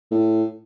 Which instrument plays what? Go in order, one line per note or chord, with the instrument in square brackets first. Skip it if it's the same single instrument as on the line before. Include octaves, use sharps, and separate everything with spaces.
[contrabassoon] A2